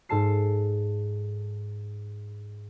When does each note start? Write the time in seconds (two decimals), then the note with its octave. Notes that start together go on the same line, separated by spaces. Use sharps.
0.09 G#2 A4 A5 C7